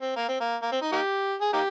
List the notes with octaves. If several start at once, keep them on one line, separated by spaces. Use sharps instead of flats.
C4
A#3
C4
A#3
A#3
C4
D#4
A#3 D#4 G4
G#4
A#3 D#4 G4